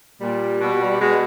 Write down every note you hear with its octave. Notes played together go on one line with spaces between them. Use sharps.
A#2 G3
B2
B2 G#3